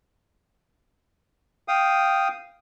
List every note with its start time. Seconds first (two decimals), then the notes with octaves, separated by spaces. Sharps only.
1.68 F5 G5 D#6